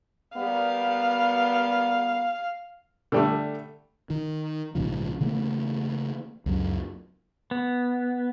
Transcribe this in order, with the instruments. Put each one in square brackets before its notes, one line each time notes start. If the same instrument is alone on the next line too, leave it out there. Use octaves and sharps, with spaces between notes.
[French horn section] G3 A#3 B3 [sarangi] F5
[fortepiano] D3 G3 A3
[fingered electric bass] D#3
A#1 G#2 C#3 F3
C#3 E3 A3 A#3
C#2 F#2 F#3
[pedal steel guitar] B3